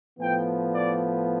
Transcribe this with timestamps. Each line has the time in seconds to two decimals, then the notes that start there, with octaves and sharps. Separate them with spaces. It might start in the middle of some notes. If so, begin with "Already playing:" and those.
0.19 A2 F3 B3 G5
0.74 D5